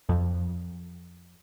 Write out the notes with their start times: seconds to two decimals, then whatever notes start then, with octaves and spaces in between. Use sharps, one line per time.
0.09 F2